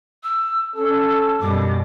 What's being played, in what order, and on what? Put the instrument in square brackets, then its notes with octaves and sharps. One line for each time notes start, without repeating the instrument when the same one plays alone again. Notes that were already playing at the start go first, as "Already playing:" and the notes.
[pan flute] E6
[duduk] C#4 [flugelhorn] A4 [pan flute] E6
[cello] F#2 B2 [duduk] G3 [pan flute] D6